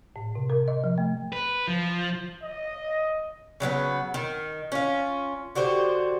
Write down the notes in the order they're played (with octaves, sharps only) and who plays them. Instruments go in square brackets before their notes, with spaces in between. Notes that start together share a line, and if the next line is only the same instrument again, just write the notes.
[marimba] A2
C3
A#4
D#5
F3
A3
[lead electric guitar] B4
F3
[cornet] D#5
[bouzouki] C#3 F#3 A3 B3
D#3
C#4 F4
D3 F#4 G4 C5